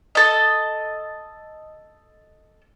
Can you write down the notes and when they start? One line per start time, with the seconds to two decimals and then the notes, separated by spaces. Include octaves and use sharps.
0.15 A4 D#5